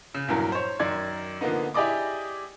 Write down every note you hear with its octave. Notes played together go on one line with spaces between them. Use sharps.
C#3
A#1 E2 G2 E3 F#3 A#4
C5 C#5
F#2 D#3 D5 G#6
D3 F3 A#3 B3 D#4
E4 G4 G#4 D5 D#5 D6